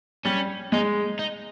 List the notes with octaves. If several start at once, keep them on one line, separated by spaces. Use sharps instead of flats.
G3 C#4
G#3 D#4
D#4